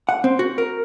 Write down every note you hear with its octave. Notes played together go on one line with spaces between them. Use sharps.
F#5
C4
F#4
A#4